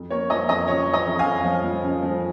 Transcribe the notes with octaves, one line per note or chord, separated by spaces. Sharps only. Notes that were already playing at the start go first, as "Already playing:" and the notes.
Already playing: F2
A#3 C#5
F3 D#5
F2 D#5
C#3 C#5
F3
D#5
F2
F5 G#5
F2
F3
F3
C#3
F3